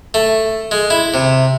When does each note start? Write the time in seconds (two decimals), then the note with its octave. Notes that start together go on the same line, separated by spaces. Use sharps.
0.14 A3
0.71 G#3
0.90 E4
1.14 C3